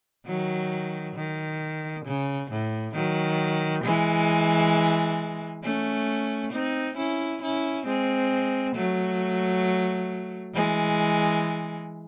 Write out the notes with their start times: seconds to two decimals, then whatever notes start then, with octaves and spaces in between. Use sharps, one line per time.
0.26 D#3 F#3
1.16 D#3
2.05 C#3
2.51 A2
2.95 D#3 F#3
3.84 E3 G#3
5.64 A3 C#4
6.52 C4 D#4
6.97 C#4 E4
7.42 C#4 E4
7.86 G#3 C4
8.76 F#3 A3
10.55 E3 G#3